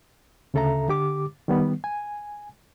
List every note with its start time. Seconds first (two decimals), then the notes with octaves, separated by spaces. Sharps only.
0.54 D2 C#3 A4 E5 A#5
0.88 D3 G4 D6
1.48 D#3 G3 B3
1.84 G#5